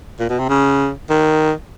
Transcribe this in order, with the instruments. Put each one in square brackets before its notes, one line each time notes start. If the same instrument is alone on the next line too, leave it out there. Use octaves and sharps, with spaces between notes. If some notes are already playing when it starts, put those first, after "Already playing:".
[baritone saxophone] A#2
B2
C3
C#3
D#3